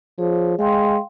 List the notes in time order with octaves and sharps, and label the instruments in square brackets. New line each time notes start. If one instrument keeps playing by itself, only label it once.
[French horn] F3 [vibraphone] G#4 C#5
[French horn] G#3 [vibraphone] F5 G5 C6